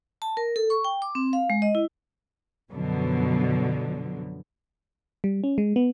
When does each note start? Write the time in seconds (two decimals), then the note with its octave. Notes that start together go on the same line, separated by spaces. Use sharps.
0.22 A5
0.37 A#4
0.56 A4
0.70 C#6
0.85 G5
1.02 D6
1.15 C4
1.33 F5
1.50 G#3
1.62 D#5
1.75 E4
2.72 F#2 B2 D3 F3 F#3
5.24 G3
5.44 C#4
5.58 G#3
5.76 B3